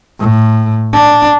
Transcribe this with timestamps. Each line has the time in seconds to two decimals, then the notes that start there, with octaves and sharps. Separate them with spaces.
0.20 A2
0.93 D4